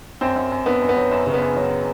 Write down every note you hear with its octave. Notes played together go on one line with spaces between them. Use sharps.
F#2 C4
F#2
F#2
F#2 B3
F#2
B3
F#3
F#2
C#3
B3
F#2
F#3